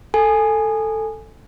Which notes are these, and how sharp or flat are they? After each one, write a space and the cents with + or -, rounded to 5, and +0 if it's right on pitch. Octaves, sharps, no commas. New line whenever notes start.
A4 +5 G#5 +0